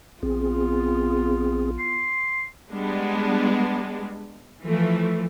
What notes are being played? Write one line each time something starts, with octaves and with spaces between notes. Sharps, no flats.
A#1 B3 C4 F4 G#4
C6
G3 G#3 B3 D4
E3 F3 A3